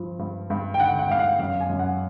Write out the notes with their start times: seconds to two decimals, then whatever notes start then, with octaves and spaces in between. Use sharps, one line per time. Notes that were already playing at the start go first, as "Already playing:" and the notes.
Already playing: G2 F3
0.19 G2
0.50 G2
0.74 G5
0.79 D3 F#5
0.99 F#5
1.09 G2 F5
1.19 F#5
1.39 F#2 F5
1.60 G#5
1.70 F#2
1.79 F#5